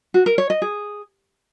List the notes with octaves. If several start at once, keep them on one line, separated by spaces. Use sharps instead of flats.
F#4
A#4
C#5
D#5
G#4